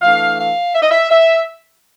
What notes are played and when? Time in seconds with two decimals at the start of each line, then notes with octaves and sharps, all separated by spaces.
0.02 E3 A3 D4 F5
0.38 F5
0.74 E5
0.82 D#5
0.91 E5
1.10 E5